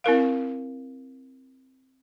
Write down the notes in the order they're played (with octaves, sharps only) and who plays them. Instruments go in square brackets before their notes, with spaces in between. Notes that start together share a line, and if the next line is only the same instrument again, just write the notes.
[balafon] C4 E4 A#4 F5